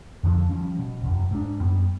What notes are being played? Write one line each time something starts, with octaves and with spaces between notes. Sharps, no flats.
F2 D3 D#3 F3
F3 G3 C#4
B2
E1 C2 F#2
G#2 D4
F#2 G3 B3